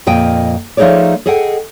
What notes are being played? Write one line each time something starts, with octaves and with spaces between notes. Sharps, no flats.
F2 A#2 D#5 G5
F3 A3 D#4 G#4 C#5 D5
G#4 A4 D#5 F#5 G5